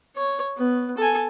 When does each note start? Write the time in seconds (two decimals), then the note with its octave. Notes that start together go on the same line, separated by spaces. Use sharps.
0.16 C#5
0.57 B3
0.98 A4 G#5